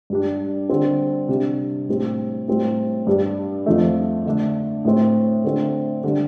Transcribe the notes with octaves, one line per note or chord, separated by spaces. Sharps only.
G2 G3 D4
D3 G3 C4
C3 G3 D4
A2 G3 C4
A2 G3 C4
G2 G3 D4
F2 F3 A3
D3 A3 D4
A2 A3 C4
D3 A3 C4
D3 G3 D4